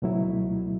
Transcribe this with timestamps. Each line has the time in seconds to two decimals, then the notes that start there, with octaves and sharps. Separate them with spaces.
0.02 C#2 B2 F#3 A3 E4